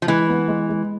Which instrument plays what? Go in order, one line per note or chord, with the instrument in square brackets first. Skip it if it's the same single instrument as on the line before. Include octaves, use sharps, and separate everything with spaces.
[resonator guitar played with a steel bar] F3
[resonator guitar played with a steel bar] E3 [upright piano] G#3
[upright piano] B3
G#3
G#3